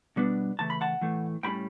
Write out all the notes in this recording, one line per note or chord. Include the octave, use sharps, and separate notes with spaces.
B2 G3 B3 D4
C#3 E3 A3 A5
B5
F#5 A5
A2 E3 A3
A2 G3 C#4 G5 B5